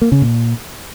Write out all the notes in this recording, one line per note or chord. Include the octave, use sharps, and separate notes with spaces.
A#3
C#3
A#2